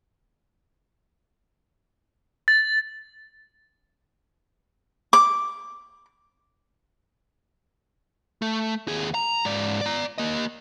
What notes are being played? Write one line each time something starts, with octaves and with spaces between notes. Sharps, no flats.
A6
D6
A3
D#2 G#4
A#5
G#2 D5
D5 A#5
A#3 D#5